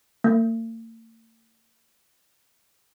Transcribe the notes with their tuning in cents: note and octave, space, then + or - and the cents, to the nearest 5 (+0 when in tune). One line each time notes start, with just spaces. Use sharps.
A#3 -45